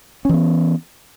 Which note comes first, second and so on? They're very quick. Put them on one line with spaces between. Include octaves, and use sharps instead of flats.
C#4 E3 B3